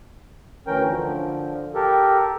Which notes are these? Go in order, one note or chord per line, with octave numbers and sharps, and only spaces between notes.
D2 E3 C#4 A#4 G5
D3 F3
G4 A4 A#4